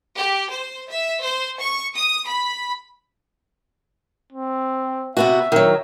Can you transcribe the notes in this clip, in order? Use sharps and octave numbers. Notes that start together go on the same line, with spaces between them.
G4
C5
E5
C5
C#6
D#6
B5
C4
C3 B3 F#4 E5
D#3 F#3